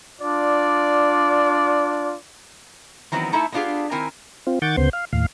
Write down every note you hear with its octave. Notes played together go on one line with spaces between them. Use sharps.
D4 F4 D5
D#3 E3 F#3 B3 C4
A3 D#4 E4 A4 E5 A5
G#3 B3 D4 F4 G4 G#4
D#3 C4 E4 A#4 G#5
C4 F4
D#3 F#5 C#6 D6 G6 A6
D2 C#3 B3 C5 C6
F5
D#2 A2 F5